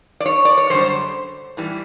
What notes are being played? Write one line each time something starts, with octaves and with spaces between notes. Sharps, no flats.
D5
C#5
D5
C#5
F#2 D3 G3 C5
A2 E3 G3